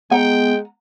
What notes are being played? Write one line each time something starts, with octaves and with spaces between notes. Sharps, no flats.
G#3 B3 F#5 G5 A#5